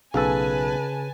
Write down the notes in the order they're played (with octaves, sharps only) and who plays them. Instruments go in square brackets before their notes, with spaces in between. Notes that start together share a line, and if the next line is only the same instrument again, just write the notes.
[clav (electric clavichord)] B1 A4 [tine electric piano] C#3 [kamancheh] B4 [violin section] G#5 A5